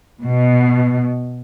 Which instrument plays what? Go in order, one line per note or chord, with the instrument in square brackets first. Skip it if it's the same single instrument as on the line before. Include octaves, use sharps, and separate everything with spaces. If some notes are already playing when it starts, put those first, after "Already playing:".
[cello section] B2